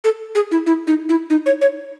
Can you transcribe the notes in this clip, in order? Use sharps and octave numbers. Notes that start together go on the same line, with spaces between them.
A4
G#4
E4
E4
D#4
E4
D#4
C#5
C#5